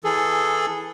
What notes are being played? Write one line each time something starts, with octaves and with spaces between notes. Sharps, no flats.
E3 G#4 A4